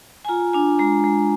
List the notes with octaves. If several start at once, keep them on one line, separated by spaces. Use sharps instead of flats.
G#5
F4 A#5
D4 G#5
G#3 A#5
G#3